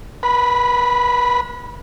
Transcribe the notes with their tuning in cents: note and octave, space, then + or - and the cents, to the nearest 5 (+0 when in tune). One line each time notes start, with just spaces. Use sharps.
B4 -35 B5 +5